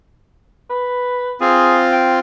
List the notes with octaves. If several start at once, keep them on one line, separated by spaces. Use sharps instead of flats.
B4
C4 F4 G#4
G5